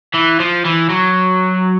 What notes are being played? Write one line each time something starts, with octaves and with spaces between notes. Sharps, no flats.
E3
F3
E3
F#3